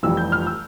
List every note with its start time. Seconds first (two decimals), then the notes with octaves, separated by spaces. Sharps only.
0.03 F1 F2 E3 G3 E6
0.17 G6
0.32 F6
0.47 E6